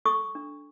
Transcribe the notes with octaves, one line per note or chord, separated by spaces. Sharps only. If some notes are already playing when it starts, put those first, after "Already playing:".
A4 C#6 D#6
D4